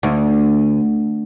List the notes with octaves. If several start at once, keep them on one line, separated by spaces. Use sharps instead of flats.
D2